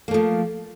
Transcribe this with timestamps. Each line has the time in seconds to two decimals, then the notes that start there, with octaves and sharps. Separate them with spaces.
0.08 A#3
0.11 A3
0.14 F3